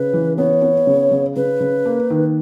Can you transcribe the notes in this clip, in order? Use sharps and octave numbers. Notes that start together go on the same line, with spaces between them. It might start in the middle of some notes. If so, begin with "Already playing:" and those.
Already playing: C#3 B4
E3
B3 C#5
B3
C#3
C#3
C#3 B4
C#3
A#3
D#3